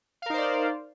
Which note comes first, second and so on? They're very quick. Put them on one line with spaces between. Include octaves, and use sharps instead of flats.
F5 A#4 D#4 C5 D5